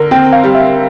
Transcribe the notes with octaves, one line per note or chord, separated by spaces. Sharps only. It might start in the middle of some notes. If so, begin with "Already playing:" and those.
Already playing: D3 A#4
C4 G5
F5
G3
E5